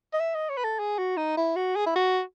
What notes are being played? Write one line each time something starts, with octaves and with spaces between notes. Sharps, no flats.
D#5
E5
D#5
C#5
B4
A4
G#4
F#4
D#4
E4
F#4
G#4
E4
F#4